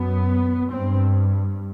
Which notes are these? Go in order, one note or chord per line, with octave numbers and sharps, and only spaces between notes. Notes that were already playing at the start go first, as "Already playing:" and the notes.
Already playing: F#2 B3
G2 C4